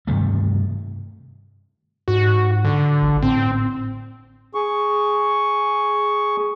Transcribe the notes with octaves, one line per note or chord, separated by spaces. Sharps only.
G2 C3 D#3 A3
G#2 F#4
D3
A1
A2 C4
G#4 C#6